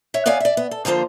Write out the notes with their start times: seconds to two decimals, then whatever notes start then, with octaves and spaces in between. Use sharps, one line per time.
0.14 C#5 E5
0.26 B3 C#5 D5 F5 G#5
0.40 D5 E5
0.57 B3
0.71 A4
0.85 D3 F3 A#3 F4 C5